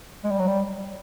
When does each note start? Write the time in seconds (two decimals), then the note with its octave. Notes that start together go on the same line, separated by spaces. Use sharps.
0.24 G#3
0.32 G3
0.39 F#3
0.48 G3